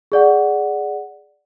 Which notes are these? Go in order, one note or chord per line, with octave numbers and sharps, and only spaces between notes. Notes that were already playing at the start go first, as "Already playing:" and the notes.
G#4 D5 F#5